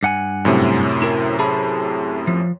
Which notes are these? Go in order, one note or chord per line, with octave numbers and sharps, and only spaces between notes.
G2 F#5 G#5
F#2 A2 C3
E4 A#4
G#4 A5 B5
F3